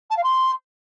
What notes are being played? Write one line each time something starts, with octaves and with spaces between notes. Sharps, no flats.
A5
F5
C6